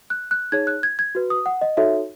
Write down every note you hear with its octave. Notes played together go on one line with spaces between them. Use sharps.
F#6
F#6
D#4 G#4 C#5 G#6
F#6
G#6
G#6
F#4 B4
D#6
F#5
D#5
D#4 F#4 A4 C#5 E5